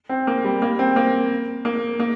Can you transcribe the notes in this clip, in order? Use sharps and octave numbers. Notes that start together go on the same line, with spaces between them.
C4
A#3
G3
A#3
C4
A#3
A#3
A#3